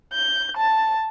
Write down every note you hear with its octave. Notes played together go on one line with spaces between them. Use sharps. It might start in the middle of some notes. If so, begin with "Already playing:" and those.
G6
A5